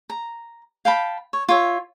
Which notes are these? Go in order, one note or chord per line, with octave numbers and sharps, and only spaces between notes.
A#5
F5 G5 A5 B5
C#5
F4 C#5 E5